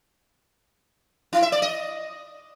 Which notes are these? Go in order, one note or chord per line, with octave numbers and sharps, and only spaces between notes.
E4
E5
D5
D#5